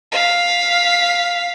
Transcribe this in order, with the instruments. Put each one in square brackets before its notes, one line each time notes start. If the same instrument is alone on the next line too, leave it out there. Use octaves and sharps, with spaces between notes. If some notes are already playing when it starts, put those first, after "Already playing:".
[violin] F5 B6